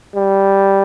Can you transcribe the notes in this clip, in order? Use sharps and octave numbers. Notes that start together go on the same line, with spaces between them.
G3